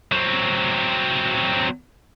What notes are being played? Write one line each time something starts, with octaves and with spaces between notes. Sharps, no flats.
F#3 C4